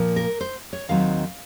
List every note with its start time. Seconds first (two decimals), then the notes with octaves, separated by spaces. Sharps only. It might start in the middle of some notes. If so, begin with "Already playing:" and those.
Already playing: A#2 F3 A#3
0.16 A#4
0.41 C5
0.73 C#5
0.89 D#2 D#3 F#3 C4 F5